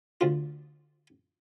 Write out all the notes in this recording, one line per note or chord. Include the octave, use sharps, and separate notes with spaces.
D2 F4